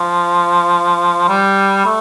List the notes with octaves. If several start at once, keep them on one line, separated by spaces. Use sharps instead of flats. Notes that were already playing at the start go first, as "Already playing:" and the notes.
Already playing: F3
G3
A3